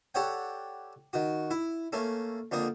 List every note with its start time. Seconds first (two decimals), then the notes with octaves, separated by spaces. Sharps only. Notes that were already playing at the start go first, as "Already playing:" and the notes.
0.15 G4 A4 C#5 D5 F#5 G5
1.13 D#3 F#4
1.51 E4
1.93 A3 A#3 C#4 A4
2.51 F2 D3 A#3 A#5 D#6